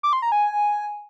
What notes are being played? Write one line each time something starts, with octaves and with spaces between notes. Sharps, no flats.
D6
C6
A#5
G#5